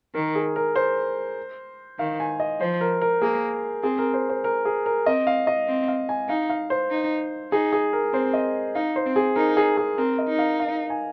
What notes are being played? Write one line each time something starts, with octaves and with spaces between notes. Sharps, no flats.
D#3 A#4
G#4
A#4
C5
D#3 F5
G#5
D#5
F3 C5
A#4
A#4
A#3 G#4
C4 G#4
A#4
C5
C5
A#4
G#4
A#4
C4 D#5
F5
D#5
C4
F5
G#5
D#4 F5
F5
C5
D#4
D#4 G#4
G#4
A#4
C4 C5
D#5
D#4 F5
C5
C4
G#4
D#4 A#4
G#4
G#4
C4 A#4
D#5
D#4
F5
F5
G#5